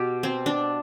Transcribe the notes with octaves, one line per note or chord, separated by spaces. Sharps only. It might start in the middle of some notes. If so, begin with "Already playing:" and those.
Already playing: B2 G4
C4
D4